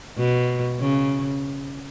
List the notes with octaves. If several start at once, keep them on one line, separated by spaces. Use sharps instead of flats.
B2
C#3